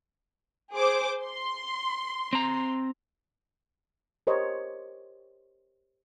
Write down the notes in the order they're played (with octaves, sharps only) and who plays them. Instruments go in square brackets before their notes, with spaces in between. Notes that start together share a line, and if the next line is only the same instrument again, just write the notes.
[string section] G#4 C5 D6
C6
[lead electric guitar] C4 A#5
[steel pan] G4 A#4 C5 C#5 D#5